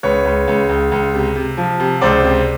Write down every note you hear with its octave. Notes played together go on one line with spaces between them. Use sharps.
C#2 B4 C#5
C#2
C#2
C#2
C#2
C3
C3
F3
C3
C#2 C5 D5
C3